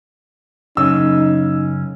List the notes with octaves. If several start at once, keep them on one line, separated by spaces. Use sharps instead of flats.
F#2 C#3 C#4 D#4 E6